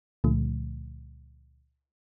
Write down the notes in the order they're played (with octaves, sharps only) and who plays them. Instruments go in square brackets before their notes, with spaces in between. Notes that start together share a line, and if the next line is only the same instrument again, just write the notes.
[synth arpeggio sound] C#2 A#2 D3 F3 A3